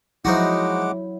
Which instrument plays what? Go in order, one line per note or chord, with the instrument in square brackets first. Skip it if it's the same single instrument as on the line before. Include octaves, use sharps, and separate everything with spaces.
[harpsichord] F3 D#4 F#4 [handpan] F#3 E4 [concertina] G#3 F#5 D6